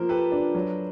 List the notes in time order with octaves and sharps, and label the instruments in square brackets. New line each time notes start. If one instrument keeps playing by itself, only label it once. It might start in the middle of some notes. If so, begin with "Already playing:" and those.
Already playing: [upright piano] F3 A#3 [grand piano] A#4 C5
[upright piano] G4 [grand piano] A4 B4
[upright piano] D4
F#3